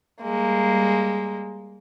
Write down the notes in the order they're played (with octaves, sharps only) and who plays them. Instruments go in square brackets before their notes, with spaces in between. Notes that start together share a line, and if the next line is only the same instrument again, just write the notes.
[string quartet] G3 G#3 A#3